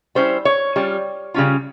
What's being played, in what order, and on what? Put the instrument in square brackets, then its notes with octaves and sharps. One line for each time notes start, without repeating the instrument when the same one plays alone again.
[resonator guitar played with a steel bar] G3 C#4 E4 C5
C#5
G3 C#4 F4
C#3 G3 C#4 F4